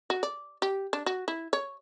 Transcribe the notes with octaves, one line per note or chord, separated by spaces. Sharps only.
F#4
D5
G4
D4
F#4
E4
C#5